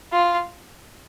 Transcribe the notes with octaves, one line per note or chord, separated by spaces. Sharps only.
F4